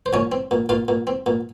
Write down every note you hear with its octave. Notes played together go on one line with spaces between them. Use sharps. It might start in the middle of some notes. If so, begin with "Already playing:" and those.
C5
A#2 C#4 C#5
C4
A#2
A#2 F4 F5
A#2
C4
A#2